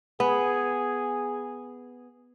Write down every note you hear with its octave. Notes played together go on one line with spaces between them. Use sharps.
B3 G#4